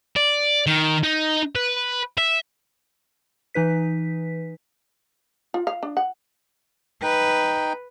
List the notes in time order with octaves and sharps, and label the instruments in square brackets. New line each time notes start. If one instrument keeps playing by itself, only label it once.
[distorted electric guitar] D5
D#3
D#4
B4
E5
[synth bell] E3 D#4 B4 B6
[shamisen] F4
F5
D4
F#5
[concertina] D#4 G5 [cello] B4